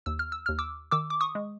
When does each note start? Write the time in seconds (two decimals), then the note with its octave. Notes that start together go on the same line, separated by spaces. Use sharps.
0.06 D#2 E6
0.19 F6
0.32 E6
0.46 D#2 F6
0.59 D6 E6
0.91 D#3 D6 E6
1.10 D6
1.21 C#6 D#6
1.35 G#3